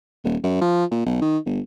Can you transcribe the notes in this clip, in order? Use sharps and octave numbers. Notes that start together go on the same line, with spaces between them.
D#1
F#2
F3
A#2
B1
D#3
G1